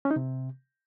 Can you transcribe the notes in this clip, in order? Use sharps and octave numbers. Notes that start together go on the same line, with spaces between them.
C#4
D#4
C3